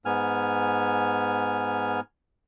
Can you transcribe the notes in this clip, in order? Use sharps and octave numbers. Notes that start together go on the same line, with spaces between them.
G#2 B3 G#5 F6